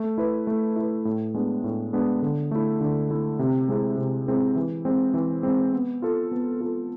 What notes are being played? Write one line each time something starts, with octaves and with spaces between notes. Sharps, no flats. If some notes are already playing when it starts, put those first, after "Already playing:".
Already playing: A3
E4 B4
A3
E4 B4
A2
G#3 B3 D4
A2
G#3 B3 D4
D3
A3 E4
D3
A3 E4
C3
G#3 C4 E4 G#4
C3
G#3 C4 E4 G#4
E3
G#3 C4
E3
G#3 C4
B3
F4 A4
B3
F4 A4